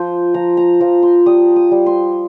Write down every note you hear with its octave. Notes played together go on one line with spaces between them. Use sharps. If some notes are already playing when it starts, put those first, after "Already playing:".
Already playing: F3 C5
F3 A#5
A#5
F3 A#5
C6
G3 D#6
D#6
G3
C6